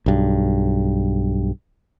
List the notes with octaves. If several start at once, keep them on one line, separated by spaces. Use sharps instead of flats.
B1 G2